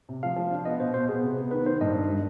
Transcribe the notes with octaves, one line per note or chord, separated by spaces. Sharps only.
C3
F3 F5
F3
D4
B3 D#5
B2 C5
B2 C5
B3 G#4
C3
B3
D#3 B4
D#3 C5
G2 D#5
D4
G3